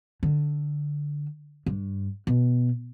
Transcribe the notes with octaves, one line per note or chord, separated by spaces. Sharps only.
D3
G2
B2